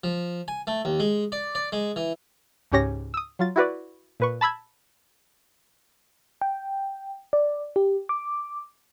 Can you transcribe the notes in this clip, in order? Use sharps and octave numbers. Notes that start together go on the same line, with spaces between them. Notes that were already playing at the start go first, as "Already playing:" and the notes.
F3
G#5
A3
D#2
G#3
D5
D5
G#3
E3
C#2 G#2 C#4 G4 C#5 A#6
D#6 E6
F#3 F4 A6
E4 F#4 B4 D5
A#2 B4 C#6
A5 B5 E6 G#6
G5
D5
G4
D6